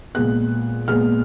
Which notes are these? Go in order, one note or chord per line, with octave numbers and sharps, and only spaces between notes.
A#2 G#3 B3 F#6
A#2 G#3 B3 F6